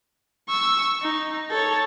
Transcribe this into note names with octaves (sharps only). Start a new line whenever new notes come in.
C#6 E6
D#4
A4 C#5